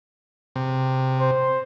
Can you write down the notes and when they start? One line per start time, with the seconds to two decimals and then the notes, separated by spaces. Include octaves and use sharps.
0.56 C3
1.20 C5